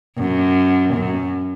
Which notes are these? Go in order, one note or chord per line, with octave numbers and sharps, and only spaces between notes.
F#2
F#2